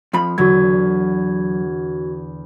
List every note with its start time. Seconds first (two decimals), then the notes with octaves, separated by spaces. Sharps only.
0.13 F2 F3 B5
0.38 E2 D3 F#3 F#4 G#6